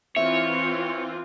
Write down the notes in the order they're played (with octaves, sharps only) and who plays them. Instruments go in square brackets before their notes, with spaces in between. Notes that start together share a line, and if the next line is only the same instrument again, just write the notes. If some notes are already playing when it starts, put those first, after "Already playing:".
[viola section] E3 C4 F4 [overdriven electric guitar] C#5 [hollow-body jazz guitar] E5